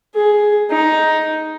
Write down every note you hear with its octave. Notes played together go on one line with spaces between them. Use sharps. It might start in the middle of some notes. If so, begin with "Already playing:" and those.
G#4
D#4